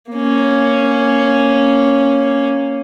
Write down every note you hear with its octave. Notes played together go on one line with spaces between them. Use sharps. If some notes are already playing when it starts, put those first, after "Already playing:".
A#3 C#4